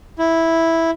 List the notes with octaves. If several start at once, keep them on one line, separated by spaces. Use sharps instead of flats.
E4